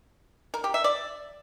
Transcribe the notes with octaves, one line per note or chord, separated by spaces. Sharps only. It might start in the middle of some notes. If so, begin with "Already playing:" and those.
A#4
G4
E5
D5